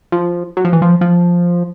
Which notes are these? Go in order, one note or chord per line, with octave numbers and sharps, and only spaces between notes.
F3
F#3
F3
E3
F3
F3